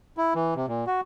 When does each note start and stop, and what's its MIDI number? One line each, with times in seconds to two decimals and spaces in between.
0.17 0.33 64
0.35 0.54 52
0.56 0.66 48
0.68 0.85 46
0.87 1.01 66